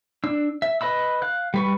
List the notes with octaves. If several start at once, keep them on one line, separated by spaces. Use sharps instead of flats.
D4 E6
E5
B4 D#5 B5 E6
F5 F#6
G3 B4 C#6